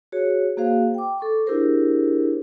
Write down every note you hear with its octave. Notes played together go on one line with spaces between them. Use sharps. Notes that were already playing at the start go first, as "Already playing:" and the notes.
F#4 G#4 C#5
A#3 F#4 G#4 C5 F5
G5 D6
A4 C#6 D6
D4 E4 G4 G#4 A#4 C5